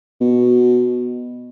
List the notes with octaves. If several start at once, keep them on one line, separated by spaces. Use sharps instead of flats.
B2